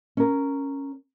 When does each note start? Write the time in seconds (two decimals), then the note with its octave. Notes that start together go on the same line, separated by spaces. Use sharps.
0.17 C#4 A#4